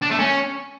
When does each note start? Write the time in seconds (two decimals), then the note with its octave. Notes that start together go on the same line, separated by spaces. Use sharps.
0.02 D4
0.10 A3
0.19 C#4